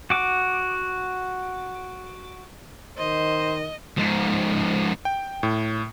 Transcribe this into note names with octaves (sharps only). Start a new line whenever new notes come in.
F#4 D6
D#3 C5 D#5
G#2 F3
G5
A2